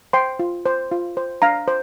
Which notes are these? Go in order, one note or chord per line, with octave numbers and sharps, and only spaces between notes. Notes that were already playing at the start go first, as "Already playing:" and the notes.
C5 G5 C6
F4
C5
F4
C5
D4 F5 A#5
C5